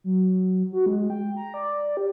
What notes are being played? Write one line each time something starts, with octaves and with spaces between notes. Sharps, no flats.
F#3
F#4
G#3
G5
A#5
D5
G4